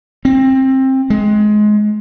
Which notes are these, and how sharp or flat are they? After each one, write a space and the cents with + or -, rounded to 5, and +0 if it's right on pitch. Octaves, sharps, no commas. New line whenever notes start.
C4 +20
G#3 +20